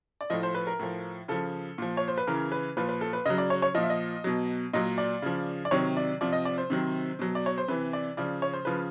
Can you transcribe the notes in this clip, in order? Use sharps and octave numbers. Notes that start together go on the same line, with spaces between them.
D5
A2 F3 D#5
C5
B4
A#4
A2 F3
C#3 F3 A4
A#2 F3
C#5
C5
B4
C#3 E3 A#4
B4
A#2 F3 B4
B4
A4
B4
C#3 F#3 D#5
D5
C#5
C#5
A#2 F3 D#5
E5
D#5
B2 F#3
A#2 F#3 D#5
D5
C#3 F3
D5
C3 D#3 F#3 C#5
D5
C3 F3 D5
D#5
D5
C5
C3 D#3 F#3
B2 F#3
D5
C#5
C5
C3 E3 B4
D5
C#3 F3 D5
C#5
C5
C#3 F3 B4